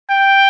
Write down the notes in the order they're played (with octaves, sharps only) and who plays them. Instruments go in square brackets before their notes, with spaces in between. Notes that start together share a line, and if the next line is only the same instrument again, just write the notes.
[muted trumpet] G5